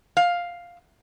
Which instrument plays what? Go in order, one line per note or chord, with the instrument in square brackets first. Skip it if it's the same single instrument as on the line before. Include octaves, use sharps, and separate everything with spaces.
[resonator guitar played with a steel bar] F5